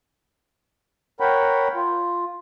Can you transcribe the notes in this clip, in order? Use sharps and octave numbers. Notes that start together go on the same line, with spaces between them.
A#4 C#5 F#5 G5 B5
F4